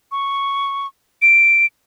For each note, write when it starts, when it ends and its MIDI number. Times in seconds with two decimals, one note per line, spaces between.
0.12 0.87 85
1.22 1.66 98